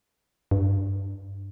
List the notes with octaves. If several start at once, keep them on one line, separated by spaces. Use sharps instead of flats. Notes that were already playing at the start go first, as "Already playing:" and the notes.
G2